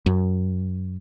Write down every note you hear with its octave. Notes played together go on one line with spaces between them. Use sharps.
F#2